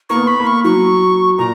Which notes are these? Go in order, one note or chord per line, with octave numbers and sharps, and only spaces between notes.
A#3 C#6
B3
B5
A#3
C#6
F#3 C#6
A#2 A#5